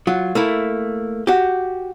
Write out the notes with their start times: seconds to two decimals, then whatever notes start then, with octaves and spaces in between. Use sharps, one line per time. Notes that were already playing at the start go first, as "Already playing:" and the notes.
0.07 F#3 F4
0.35 A3 A#3 E4
1.27 F#4 G4